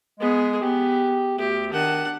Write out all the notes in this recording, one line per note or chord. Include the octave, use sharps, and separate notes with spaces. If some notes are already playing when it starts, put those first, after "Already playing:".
G#3 B3 G#4
B3 G4
D2 G4
D#3 D4 F#5